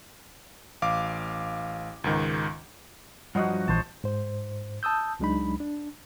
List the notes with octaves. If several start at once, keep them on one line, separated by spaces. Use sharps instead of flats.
A1 F5 D6
C#2 G#2 D#3
G2 F3 F#3 F#4 D#5 F#5
A#1 E3 G3 C5 A5
G#2 C5
A5 D#6 E6 G6
C#2 F#3 G#3 D4 D#4 B5
D4